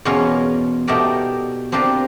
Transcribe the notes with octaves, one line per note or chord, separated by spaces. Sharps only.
E2 B2 C#4 F4 A#4 C#5
B2 A3 D#4 G4 A#4 D5
C4 D4 F4 G4 A#4